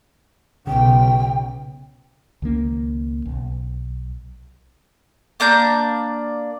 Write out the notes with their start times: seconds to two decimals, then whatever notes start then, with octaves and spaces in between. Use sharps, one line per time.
0.67 B1 C#3 G5
2.42 C#2 D#3 A#3 C#4
3.25 B1
5.40 A#3 D4 A#5 G6